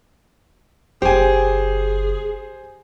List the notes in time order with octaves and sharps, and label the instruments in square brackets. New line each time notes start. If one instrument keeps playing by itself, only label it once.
[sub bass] F#1 [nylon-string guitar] G4 [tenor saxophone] G#4 [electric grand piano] C5 G#5